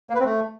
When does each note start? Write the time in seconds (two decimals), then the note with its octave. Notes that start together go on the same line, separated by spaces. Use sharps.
0.10 A#3
0.15 B4
0.20 C4
0.25 A3